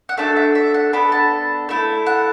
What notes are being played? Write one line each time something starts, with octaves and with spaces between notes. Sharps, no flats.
F#5
A3 D4 F#4 A4 E5
E5
E5
F#5
B3 D4 A4 B5
A5
A3 E4 A4
F#5